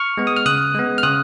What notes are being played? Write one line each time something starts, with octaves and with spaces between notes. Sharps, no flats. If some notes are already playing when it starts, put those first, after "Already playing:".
Already playing: C#6 F6
G#3 B3
D#6
F6
C#3 D#6 F#6
G#3 B3
F6
C#3 D#6 F#6